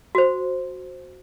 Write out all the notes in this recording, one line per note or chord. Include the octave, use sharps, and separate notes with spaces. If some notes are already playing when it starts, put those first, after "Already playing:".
F#4 C5